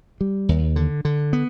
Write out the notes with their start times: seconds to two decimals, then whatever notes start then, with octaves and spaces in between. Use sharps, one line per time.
0.21 G3
0.49 D#2
0.76 D3
1.05 D3
1.33 B3